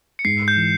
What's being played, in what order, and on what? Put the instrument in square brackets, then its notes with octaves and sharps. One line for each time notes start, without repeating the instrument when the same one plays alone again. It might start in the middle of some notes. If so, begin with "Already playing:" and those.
[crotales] C#7
[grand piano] G#2 [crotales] C7
[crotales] G6
[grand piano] E3